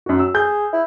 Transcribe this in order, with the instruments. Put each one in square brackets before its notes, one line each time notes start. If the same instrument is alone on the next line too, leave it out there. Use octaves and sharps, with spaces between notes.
[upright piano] F#2 F#4
E6
[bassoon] G#4 [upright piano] G6
[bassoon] E4